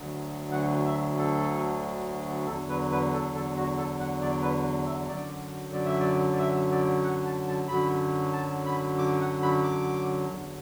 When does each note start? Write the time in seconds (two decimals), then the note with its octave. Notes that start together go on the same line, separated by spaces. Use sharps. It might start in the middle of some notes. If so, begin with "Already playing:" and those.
Already playing: D2 D3 F#3
0.52 F#5
0.85 E5
1.18 A4
2.47 E2 D3 F#3 A4
2.69 B4
2.92 B4
3.13 A4
3.35 A4
3.56 F#4
3.78 A4
4.00 F#5
4.22 D5
4.42 B4
4.86 E5
5.08 F#2 D3 F#3 D5
5.73 D5
5.86 E5
6.00 D5
6.32 D5
6.39 E5
6.72 D5
7.04 F#5
7.26 A5
7.48 A5
7.68 F#2 D3 F#3 B5
8.33 A5
8.66 B5
8.98 D6
9.21 F#5
9.43 B5
9.64 D6
10.29 E2 D3 F#3